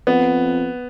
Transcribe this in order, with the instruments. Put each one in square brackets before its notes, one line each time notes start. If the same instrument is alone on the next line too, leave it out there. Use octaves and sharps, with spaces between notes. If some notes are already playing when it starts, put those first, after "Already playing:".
[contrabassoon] F2 [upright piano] B3